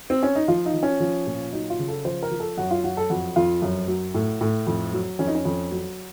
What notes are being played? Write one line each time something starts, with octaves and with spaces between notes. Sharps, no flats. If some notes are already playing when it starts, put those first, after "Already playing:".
C4
C#4
D#4
F3 F4
D#4
F3
C#4
F3
A#2
F#3 D#4
F4
C#3
A4
F3 C5
A#4
F3
A4
F#2 F#4
F4
F#2 F#4
A4
F2 F#4
F2 F4
F#2
F#3
A2
A2
F2
F#3
F2 C#4
D#4
C#4
F2
F#3